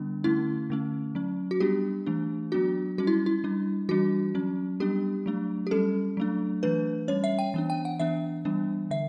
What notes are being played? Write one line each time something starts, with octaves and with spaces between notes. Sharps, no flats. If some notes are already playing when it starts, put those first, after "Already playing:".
Already playing: D3 G3 B3 D4
D3 A3 C#4 E4
D3 A3 C#4
F#3 C#4
F#4
G3 B3 D4 G4
E3 A3 D4
F#3 B3 D4 F#4
G3 C#4 F#4
E4
E4
G3 D4
E3 G3 D4 F#4
F#3 C#4
G3 B3 D4 G4
F#3 A3 D4
G4
G3 C#4 A4
F#3 A3 D4
E3 A3 D4 B4
G3 C#4 C#5
E5
G5
E3 B3 D4
G5
F#5
E3 B3 D4 E5
E3 G3 B3 D4
D3 E5